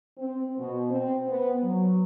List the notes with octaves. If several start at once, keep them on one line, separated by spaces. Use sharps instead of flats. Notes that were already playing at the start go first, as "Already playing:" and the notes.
C4
B2
C4
B3
F#3